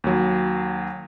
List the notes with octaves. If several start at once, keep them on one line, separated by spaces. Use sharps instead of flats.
D#2 F#3